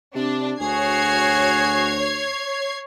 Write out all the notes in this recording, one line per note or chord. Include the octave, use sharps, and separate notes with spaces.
C3 D4
D2 F#4 G#4 C#5 G#6 C7